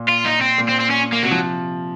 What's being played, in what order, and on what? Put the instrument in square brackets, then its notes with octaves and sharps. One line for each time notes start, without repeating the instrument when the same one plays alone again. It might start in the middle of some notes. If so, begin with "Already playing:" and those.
Already playing: [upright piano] A#2
[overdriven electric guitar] F4
D#4
C4
[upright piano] A#2
[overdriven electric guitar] C4
C4
C#4
A#3
[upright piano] C3 [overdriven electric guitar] F#3
[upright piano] F3